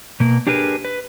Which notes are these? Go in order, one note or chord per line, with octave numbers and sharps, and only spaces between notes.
B2 A#3
D4 G4 G#4 A#4 B4
B4